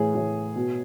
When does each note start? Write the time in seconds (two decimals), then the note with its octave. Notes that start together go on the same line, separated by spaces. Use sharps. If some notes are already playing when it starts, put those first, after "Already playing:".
Already playing: A2 E3 G#4
0.15 A2 E3
0.56 B2